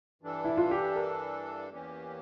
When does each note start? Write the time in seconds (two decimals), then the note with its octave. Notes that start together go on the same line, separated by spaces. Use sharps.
0.22 G2 E3 G3 D4 A4
0.45 E4
0.57 F4
0.71 G4
0.96 A#4
1.70 E2 E3 A#3 C#4 G4